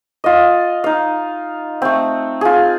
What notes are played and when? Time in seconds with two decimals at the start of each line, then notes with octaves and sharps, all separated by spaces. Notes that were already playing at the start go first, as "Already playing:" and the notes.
0.24 F4 D#5
0.84 D#4 F5
1.82 A3 C4
2.41 F4 G#4